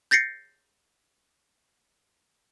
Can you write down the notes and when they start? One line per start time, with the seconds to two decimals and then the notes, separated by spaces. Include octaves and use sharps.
0.11 G6 A6 A#6 C7 C#7